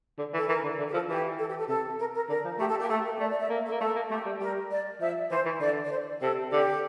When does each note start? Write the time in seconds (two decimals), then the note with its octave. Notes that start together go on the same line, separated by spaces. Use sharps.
0.18 D3
0.33 E3
0.37 A4
0.49 E3 A#4
0.64 D3
0.79 D3
0.88 G4
0.93 F3 A4
1.09 E3 G4
1.39 A4
1.49 G4
1.59 A4
1.69 C3 A4
2.00 A#4
2.15 A#4
2.29 D3 A#4
2.44 F3
2.59 A3 G4
2.70 A4
2.80 G4
2.83 A#3
2.90 A3 A4
3.05 A#4
3.19 A3 D5
3.31 D5
3.39 E5
3.50 A#3
3.65 A4
3.71 A#3
3.81 A3 A4
3.95 A#3
4.11 A3 G4
4.25 G3
4.40 G3 A#4
4.71 D5
5.01 F3 E5
5.31 E3 C5
5.45 E3
5.60 D3 D5
5.84 D5
5.91 C5
6.21 C3 A4
6.51 D3 G4